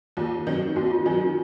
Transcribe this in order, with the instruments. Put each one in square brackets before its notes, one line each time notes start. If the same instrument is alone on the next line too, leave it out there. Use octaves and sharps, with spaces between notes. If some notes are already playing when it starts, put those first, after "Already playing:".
[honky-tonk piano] D#2 [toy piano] F4
[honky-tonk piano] D#3 F#3 C4
[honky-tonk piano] D#2 [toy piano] F#4
[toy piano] F4
[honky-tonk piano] D#3 F#3 C4 [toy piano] D#4
[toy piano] F4